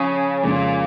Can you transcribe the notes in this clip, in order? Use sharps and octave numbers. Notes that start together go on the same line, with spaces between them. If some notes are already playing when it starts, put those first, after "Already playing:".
Already playing: C#3 F3
F2 A#2 C#3 G#3 C#4